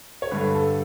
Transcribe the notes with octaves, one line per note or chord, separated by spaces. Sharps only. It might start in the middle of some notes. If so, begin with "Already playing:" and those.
C#5
G2 D3 B4
A4